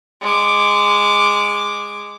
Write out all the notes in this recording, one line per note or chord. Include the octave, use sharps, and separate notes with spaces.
G#3 D6